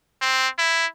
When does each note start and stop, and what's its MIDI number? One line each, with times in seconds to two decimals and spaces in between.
0.21 0.48 60
0.58 0.86 64